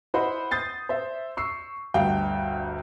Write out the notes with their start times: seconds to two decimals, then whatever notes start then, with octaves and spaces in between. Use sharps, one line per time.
0.14 E4 C5 D#5 F#5 B5
0.51 D#6 G6 A6 C7
0.89 C5 E5
1.37 C#6 E6 C7
1.94 G1 D2 G3 F5 G5